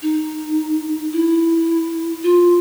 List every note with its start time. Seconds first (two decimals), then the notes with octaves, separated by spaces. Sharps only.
0.02 D#4
1.13 E4
2.23 F4